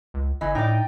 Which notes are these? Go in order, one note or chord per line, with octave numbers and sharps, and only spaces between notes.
C#2
G1 E3 D#5
A2 D#4 D5 G5